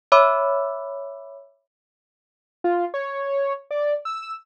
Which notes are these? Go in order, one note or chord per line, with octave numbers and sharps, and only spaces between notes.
C#5 E5 B5 D6 E6
F4
C#5
D5
E6